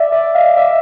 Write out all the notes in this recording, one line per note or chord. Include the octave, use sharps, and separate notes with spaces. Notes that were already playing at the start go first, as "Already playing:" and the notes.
Already playing: D5 E5
D5 E5
D#5 F5
D5 E5